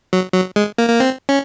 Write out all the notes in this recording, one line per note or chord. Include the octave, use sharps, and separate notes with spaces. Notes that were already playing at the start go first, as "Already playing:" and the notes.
F#3
F#3
G#3
A#3
A#3
C4
C#4